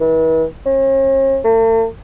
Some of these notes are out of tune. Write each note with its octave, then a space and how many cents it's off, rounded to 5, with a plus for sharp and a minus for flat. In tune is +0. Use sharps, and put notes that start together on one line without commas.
E3 -40
C#4 -45
A3 +45